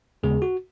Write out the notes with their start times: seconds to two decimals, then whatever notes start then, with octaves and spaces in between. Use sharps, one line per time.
0.23 D#2 C#3 G#3 B3 G#4
0.42 F#4